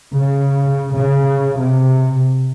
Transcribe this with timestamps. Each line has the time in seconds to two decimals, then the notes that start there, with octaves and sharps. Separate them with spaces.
0.15 C#3
0.96 C#3
1.60 C3